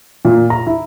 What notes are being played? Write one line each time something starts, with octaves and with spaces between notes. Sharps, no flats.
A#2
A#5
E4